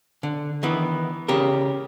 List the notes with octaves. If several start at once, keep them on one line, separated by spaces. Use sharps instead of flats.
D3
D#3 E3 B3
C#3 G4 A#4